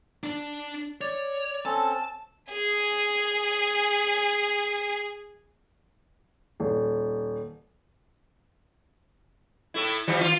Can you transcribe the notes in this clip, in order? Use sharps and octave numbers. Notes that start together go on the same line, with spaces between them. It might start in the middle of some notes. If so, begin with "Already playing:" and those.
D4 D5
C#5 D5
C4 C#4 A4 A5
G#4 G#5
D#1
A2 A3 E4
D#3 F3 G3
F4